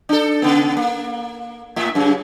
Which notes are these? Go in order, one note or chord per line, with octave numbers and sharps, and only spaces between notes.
D4 A4
C#3 B3
A#3
A2 E5
F#2 C#3